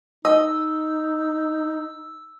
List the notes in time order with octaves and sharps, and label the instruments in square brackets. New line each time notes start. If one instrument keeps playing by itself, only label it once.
[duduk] D#4 [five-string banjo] D#5 [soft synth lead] E6